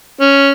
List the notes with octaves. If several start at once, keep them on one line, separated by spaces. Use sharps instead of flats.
C#4